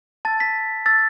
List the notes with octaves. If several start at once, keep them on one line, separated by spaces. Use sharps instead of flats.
A5 E6 A6
B6
A5 E6 A6